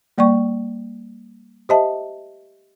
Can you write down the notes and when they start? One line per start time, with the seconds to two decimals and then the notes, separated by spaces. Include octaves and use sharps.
0.18 G3 A#3 D5 G5 C#6
1.69 G4 C5 D#5 E5 A5